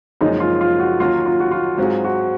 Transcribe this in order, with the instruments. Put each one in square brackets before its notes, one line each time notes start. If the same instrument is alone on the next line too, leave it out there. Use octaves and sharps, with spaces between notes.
[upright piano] F#1 F#2 F3 G#3 C#4 [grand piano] D#4
[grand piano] F4
F4
F#4
[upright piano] D#2 D#3 F#3 C#4 F#4 [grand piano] F4
[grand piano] F4
F#4
F4
[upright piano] G#2 F#3 C4 F4 G#4 [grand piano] F#4
[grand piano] F#4